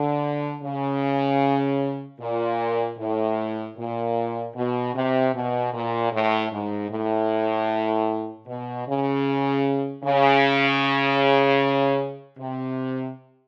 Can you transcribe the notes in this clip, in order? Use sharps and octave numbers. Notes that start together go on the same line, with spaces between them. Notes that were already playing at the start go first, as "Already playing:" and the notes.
Already playing: D3
C#3
A#2
A2
A#2
B2
C3
B2
A#2
A2
G#2
A2
B2
C#3
C#3
C3